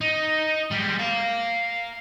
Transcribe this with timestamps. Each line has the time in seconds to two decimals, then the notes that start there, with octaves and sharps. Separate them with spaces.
0.01 D#4
0.71 G3 G#3
0.99 F5 A#5